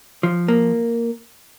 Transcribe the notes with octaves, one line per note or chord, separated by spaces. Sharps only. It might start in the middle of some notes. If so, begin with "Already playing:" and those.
F3
A#3